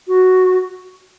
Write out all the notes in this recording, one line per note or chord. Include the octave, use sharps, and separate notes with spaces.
F#4